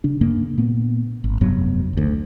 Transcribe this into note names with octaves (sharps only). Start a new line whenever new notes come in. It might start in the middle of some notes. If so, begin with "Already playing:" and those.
C#3 D4
G2 C#3 A#3 D4
A#2 A#3 B3
G#1
F1 G2 F#3 B3
F#1 D2